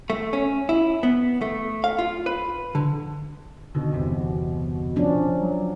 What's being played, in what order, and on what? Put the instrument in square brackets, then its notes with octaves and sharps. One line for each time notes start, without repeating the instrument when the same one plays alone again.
[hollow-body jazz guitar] A3
C#4
E4
B3
A3
F5
F4
B4
D3
[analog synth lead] B2 [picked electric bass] D3 D#3
[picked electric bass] G1 E2 C3
[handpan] F3 C#4 D4
[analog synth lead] F#3